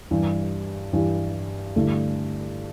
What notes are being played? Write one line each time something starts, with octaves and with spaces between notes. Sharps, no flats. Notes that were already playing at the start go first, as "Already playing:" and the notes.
G2 E3 G3
G2 E3 G3
G2 D3 A3 E4